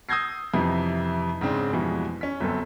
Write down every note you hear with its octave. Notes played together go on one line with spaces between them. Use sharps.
D#6 E6 G6 G#6 A#6 C7
F2 C3 E3 D#4
G#2 C#3 C4 D4
F2 B2 E3 G3 G#3
C#4 B6
G1 F#2 C4 A4